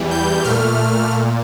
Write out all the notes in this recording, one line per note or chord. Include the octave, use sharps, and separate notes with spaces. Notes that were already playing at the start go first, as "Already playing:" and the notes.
Already playing: E2 E3 G3
G6
A#2 A3 F6
A#2